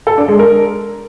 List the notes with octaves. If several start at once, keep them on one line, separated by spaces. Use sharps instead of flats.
A4
D4
G#3
A#4